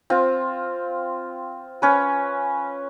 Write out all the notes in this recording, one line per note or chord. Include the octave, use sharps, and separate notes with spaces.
C4 F4
C#4 B4